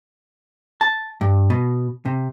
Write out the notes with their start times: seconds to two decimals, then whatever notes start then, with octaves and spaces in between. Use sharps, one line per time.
0.81 A5
1.21 G2
1.50 B2
2.06 C3